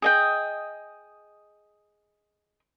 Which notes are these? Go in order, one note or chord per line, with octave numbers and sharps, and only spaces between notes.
G#4 D#5 G5